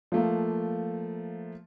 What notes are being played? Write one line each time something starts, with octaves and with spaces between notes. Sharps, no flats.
F3 A3 A#3